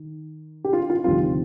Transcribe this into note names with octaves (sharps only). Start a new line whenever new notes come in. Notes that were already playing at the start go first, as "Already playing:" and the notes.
Already playing: D#3
G4
F4
F4
F1 D#2 D3 G3 C4 F4